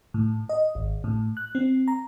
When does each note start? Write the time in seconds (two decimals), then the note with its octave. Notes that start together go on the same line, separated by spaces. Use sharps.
0.14 A2
0.49 D#5
0.75 G#1
1.04 A2
1.37 F#6
1.55 C4
1.88 A#5